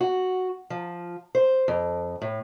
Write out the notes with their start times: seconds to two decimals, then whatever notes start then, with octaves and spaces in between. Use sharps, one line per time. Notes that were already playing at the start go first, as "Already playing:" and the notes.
0.01 F#4
0.70 F3
1.35 C5
1.68 F2
2.22 A2